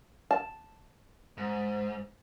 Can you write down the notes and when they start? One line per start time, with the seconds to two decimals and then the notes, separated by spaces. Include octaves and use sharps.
0.31 A5
1.38 G#2